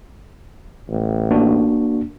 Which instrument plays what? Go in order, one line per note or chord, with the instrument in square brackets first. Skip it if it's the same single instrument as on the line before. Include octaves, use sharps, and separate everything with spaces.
[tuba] A1
[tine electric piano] A#3 D4 F#4